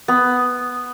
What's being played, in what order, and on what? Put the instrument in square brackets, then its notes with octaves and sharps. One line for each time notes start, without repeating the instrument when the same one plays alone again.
[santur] B3